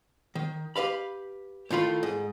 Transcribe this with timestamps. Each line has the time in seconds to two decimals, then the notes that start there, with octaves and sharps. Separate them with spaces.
0.35 D#3
0.76 G4 B4 F5 B5
1.71 A2 D#3 F4 B5
2.03 G#2